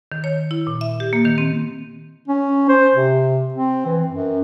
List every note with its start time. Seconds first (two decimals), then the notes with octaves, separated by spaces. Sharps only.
0.12 D#3
0.24 C#5
0.51 E4
0.67 A#2
0.81 E5
1.00 G4
1.13 A#3
1.25 D#3
1.38 C4
2.28 C#4
2.69 C5
2.94 C3
3.54 C4
3.85 E3
4.08 F#2